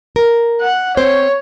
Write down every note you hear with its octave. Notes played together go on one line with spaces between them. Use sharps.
A#4
F#5
C4 C5 C#5